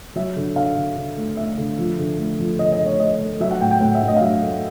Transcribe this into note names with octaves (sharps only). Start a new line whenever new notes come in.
F#3 E5
D3
D3 F5
D3
D3
A3
A3 E5
D3
F3
D3
A3
F3
D3 D#5
D#5
A3
C#5
A3 D#5
A3
F#3 E5
F#5
A2 G5
G5
A2 F#5
E5
A2
D#5
F5
F#3 E5
A3